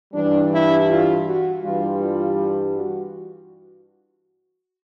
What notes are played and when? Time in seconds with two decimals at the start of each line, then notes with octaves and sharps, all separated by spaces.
0.13 G2 E3 G3 D4
0.50 E4
0.88 F4
1.24 F#4
1.62 G2 E3 G3 F4
1.99 F4
2.74 F#4